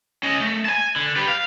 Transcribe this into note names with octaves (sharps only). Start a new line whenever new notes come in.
C#4 D#5
A3
G#5 A5
D3
G4 B4
F5